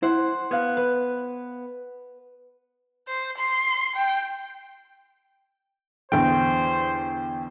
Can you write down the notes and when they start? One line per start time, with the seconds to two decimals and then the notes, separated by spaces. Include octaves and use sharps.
0.03 E4 C5 F#5
0.51 B3 F5 F#6 G#6
0.77 B4
3.08 C5
3.38 C6
3.96 G5
6.12 E2 D3 C5 G5